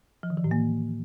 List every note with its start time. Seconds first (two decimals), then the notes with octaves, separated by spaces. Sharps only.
0.23 F3
0.30 D#3
0.37 E3
0.44 A2
0.51 A#3